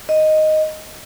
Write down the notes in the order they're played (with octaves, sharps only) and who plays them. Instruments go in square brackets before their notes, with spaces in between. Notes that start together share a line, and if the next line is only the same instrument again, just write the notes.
[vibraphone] D#5